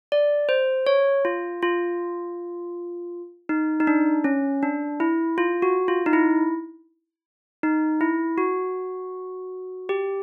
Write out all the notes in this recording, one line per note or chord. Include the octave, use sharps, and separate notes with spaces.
D5
C5
C#5
F4
F4
D#4
D#4
D4
C#4
D4
E4
F4
F#4
F4
D#4
E4
D#4
E4
F#4
G4